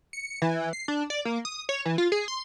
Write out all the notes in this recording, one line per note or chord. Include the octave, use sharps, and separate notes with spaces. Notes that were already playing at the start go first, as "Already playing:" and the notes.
C#7
E3
C7
D4
D5
A#3
D#6
C#5
E3
F4
G#4
C6